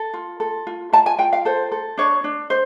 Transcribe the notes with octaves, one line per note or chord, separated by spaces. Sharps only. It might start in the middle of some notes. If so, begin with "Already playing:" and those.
Already playing: A4
F4
A4
F4
F4 A5
G#5
F4 G5
F5
A4 C5
A4
D4 C#5
D4
C5